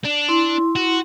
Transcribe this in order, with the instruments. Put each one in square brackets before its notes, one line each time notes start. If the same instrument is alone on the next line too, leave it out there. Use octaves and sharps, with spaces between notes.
[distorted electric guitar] D4
[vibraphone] E4 C6
[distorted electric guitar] F#4